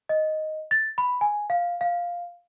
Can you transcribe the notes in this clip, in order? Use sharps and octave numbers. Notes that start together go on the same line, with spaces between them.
D#5
A6
B5
G#5
F5
F5